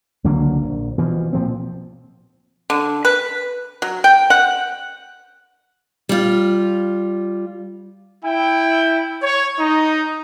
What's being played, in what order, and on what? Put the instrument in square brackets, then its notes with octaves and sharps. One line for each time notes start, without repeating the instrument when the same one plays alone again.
[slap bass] C#2 D3 F#3 A#3
A#1
B2 E3 F3
A#2 F3 C4
[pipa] D3
B4
F#3
G5
F#5
[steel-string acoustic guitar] G3 F4
[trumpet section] E4 G5
C#5
D#4